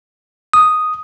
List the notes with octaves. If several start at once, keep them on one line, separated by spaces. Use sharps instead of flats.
D#6